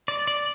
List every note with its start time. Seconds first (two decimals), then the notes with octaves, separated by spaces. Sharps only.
0.08 D5
0.27 D5